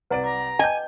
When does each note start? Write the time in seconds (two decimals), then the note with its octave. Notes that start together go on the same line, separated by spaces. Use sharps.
0.10 C2 B4 D5 F#5 A#5 D7
0.24 A#5 D6
0.59 D#5 G5 G#5 G6